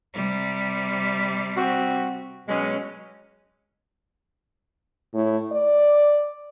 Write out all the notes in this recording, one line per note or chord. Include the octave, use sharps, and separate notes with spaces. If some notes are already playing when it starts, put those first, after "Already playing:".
C3 G3
C4 F#4
B2 F#3 G#3 C#4
A2
D5